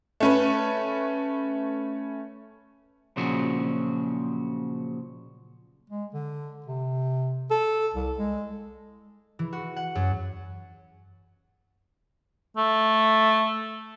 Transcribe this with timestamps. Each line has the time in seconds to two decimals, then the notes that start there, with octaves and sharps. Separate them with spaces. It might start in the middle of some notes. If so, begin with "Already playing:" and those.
0.20 A3 C#4 B4
3.17 A#2 C#3 F3 F#3 F#4
5.90 G#3
6.14 D3
6.66 C3
7.51 A4
7.94 C2
8.18 G#3
9.39 E3
9.53 F#4
9.76 F#5
9.95 F#2
12.57 A3